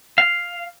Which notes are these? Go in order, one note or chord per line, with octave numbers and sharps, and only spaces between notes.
F5